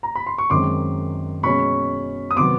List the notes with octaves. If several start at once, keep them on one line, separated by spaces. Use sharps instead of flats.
A#5
B5
C6
C#6
F#2 D#3 G#3 C4 C6 D6
B2 G#3 C#4 B5 C#6
D#6
C3 D#3 F#3 B3 C6 D6